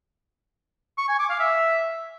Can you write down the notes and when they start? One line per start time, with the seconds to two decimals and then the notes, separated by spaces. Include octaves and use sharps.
0.98 C#6
1.09 G#5
1.19 D6
1.30 F5
1.40 E5